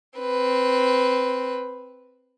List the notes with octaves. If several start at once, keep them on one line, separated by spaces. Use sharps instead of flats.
C4 B4